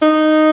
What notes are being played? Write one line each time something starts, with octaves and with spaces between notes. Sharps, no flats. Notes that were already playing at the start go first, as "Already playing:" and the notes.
D#4